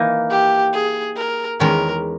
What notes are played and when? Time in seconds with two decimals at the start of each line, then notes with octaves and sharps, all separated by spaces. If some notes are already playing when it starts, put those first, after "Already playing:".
Already playing: E3 A#3 D#4
0.30 G4
0.73 G#4
1.16 A#4
1.60 E2 D#3 G#3 C#4 A#4